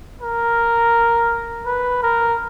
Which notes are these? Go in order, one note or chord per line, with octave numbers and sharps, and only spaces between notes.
A#4
B4
A#4